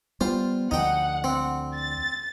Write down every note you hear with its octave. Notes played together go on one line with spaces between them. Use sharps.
G3 B3 F4 C5
D2 D3 F3 D#4 F#5 G5
C4
A6